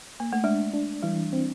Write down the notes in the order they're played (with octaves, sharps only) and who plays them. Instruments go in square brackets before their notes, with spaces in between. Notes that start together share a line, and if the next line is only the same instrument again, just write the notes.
[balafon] A#3
A3
[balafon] G#3 [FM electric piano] D4
[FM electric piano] D4
[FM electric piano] E3 [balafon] G3
[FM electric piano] C4